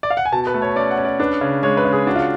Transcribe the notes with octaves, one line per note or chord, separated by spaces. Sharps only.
D5
F5
F#5
G#5
B2 A5
B4
A3
C#5
C#4 D5
F#5
C#4
D5
D4 B4
C#3
G#3 C#5
B4
C#3
G#4
D4 F#4
F4